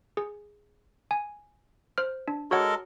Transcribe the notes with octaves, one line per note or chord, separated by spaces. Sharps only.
G#4
G#5
C5 F6
D4
G#3 F#4 A4 A#4 C#5 F#5